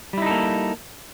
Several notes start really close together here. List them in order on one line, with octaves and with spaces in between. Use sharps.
G3 E4 D#4 A4 A#3